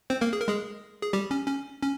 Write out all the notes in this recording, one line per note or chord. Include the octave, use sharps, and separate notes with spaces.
C4 C5
A#3 A#4
G#4
A#4
G#3 G#4
G#4
G3 G4
C#4
C#4
C#4